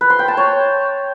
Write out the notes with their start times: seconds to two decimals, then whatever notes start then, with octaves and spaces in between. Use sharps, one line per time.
0.01 B4
0.10 C6
0.19 G5
0.28 A5
0.37 C#5